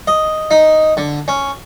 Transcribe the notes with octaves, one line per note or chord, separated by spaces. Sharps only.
D#5
D#4
D3
C#4